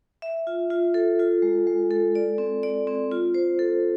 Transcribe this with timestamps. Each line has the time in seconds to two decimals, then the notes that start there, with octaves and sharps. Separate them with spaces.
0.22 E5
0.47 F4
0.70 F4
0.94 A4
1.19 F4
1.42 G#3
1.67 G#3
1.91 A4
2.15 D5
2.38 C4
2.63 D5
2.87 C4
3.11 F4
3.34 C5
3.59 A4